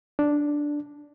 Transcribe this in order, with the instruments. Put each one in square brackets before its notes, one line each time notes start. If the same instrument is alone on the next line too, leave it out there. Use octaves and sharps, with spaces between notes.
[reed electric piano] D4